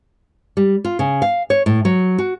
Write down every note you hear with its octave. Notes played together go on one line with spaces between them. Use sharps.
G3
F4
C#3
F5
C#5
A2
F#3
F#4